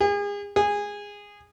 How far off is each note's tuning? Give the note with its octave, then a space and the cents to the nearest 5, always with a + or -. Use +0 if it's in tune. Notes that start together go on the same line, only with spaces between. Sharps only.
G#4 -35
G#4 -15